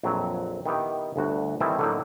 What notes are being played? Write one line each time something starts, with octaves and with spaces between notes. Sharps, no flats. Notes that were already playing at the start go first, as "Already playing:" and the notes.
A#1 F2 F#3 C4
D#3 B3 E4 G4
G1 D2 F#4
D#3 E3 G3 C4 E4 A4
A2 D3 F#3 A3 A#3 D#4